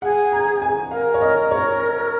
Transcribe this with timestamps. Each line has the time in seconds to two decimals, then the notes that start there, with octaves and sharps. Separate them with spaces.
0.02 G#4 F#5
0.32 A#5
0.62 G#5
0.91 A#4 F5
1.14 C#5
1.21 D#5
1.51 C#5